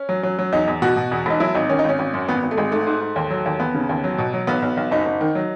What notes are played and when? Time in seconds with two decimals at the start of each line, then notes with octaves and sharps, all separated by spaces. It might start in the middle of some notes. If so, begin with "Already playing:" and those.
Already playing: C#4
0.09 F#3
0.23 F#3
0.39 F#3
0.53 E2 D#4
0.68 E2
0.82 B2 F#4
0.96 B2
1.11 E2
1.26 E1 D#4
1.40 F#3 E4
1.55 G#1 D#4
1.69 D#3 C#4
1.79 D#4
1.84 G#1 C#4
1.99 G#1
2.14 F#2
2.28 G#1 B3
2.43 G#1
2.51 A3
2.57 G#1 G#3
2.72 G#2 A3
2.87 G#2
3.01 G#2
3.16 D#2
3.30 F#3
3.46 D#2
3.60 D#2 B3
3.74 C#3
3.89 D#2
4.04 F#3
4.18 B2
4.33 F#3
4.47 B1 B3
4.62 B1
4.77 B1
4.91 F#1 D#4
5.06 F#1
5.21 D#3
5.35 F#3